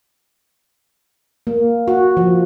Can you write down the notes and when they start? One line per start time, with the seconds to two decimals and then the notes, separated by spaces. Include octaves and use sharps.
1.47 A#3
1.88 F#4
2.17 F3